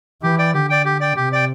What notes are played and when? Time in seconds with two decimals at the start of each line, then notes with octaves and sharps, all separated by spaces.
0.23 E3 G4
0.38 D5 G5
0.54 D3 G4
0.70 D5 G5
0.85 G4
1.01 D5 G5
1.16 C3 G4
1.32 D5 G5